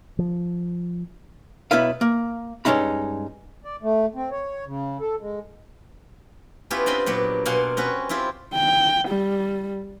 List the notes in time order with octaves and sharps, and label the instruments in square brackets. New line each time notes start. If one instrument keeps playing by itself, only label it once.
[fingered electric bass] F3
[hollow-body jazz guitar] B1 B3 E4 B4 F5
A#3
G2 A#2 G#3 C#4 D#4 B5
[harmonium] D5
A3
C4
C#5
C#3
A4
G#3
[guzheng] B3 C#4 E4 F4 G4
C4 D4 D#5 G5 B5 C6
A#2 F#3 B3 G4
B2 A#3 F5 F#5 G#5 C6
C4 C#4 F#4 B4
C4 E4 F4 G4
[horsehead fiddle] G5
G3